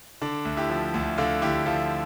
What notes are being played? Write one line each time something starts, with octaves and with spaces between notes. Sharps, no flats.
D3 D4
D2
E4 G4
F3
D2
D3 D4 F4
D2 E4 G4
F3 F4 A4